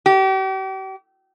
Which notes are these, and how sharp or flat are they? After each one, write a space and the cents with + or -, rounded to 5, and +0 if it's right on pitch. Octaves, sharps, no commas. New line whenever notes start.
G4 -40